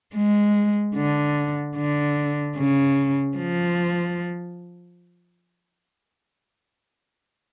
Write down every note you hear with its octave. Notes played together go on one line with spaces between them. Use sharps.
G#3
D3
D3
C#3
F3